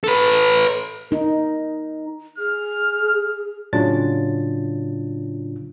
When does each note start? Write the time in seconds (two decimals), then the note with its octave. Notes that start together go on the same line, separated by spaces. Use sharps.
0.04 A4 B4
1.11 D#4 A#4
2.38 G#4 F6
3.73 A2 C#3 F#3 D4 F4 A6